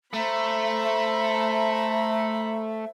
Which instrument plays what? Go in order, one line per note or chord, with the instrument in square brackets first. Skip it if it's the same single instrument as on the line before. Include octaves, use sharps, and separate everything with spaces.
[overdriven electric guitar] A3 [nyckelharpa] C5 B5 [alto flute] E5 [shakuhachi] A#5